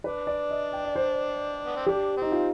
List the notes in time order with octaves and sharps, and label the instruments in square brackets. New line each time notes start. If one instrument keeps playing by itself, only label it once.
[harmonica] D4 [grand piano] B4
[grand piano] D5
D#5
G5
D5
C5
[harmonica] B3
C4
[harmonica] D4 [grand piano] G4
[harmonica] C4
[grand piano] D#4
F4